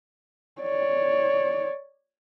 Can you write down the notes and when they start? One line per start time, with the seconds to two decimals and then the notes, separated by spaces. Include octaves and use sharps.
0.62 C#5 D5